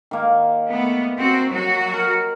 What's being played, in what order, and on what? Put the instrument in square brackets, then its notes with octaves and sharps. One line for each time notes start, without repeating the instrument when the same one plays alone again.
[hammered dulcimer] D#3 A#3
[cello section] A3 B3
C4 F#4
F#3 F#4
[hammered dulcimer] A#4